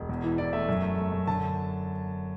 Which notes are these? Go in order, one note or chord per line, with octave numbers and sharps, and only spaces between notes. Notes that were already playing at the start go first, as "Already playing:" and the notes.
Already playing: E1
E2
E3
E3 D5
A3 E5
F#2
A3
A3
F#2
D3 A5